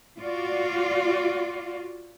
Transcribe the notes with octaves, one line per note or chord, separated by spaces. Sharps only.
F4 F#4 D5